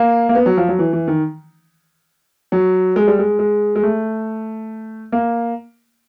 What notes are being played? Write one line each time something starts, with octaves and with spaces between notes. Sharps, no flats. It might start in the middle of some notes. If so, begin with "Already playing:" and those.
Already playing: A#3
A#3
B3
F#3
F3
F#3
E3
E3
D#3
F#3
G#3
G3
G#3
G#3
G#3
A3
A#3